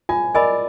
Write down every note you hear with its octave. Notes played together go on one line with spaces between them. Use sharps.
F4 G#5
A#4 D5 D#5 G#5 B5